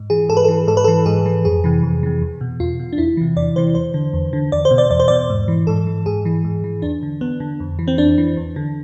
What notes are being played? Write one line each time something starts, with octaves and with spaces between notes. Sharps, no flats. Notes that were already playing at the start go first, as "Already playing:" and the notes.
Already playing: G#2
E3 G#4
G#2 A4
B4
A4
E3
G#2 A4
B4
A4
E3
G#2 G#4
E3
F2 G#4
C3 E3
F2
C3 E3
E2
B2
E2 F4
B2
D4
E2 E4
C3 E3
E2 D5
C3 E3 C5
E2 C5
D3
E2
D3
E2 D5
C5
B2
D5
E2 D5
C5
B2 D5
G#2
E3
G#2 A4
E3
G#2 G#4
E3
G#2
E3
E2 D4
D3
E2 B3
D3
F2
E3
C4
F2 D4
E3
E2
D3